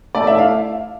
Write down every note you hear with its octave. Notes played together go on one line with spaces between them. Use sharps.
A3 D5
E4 E5
F5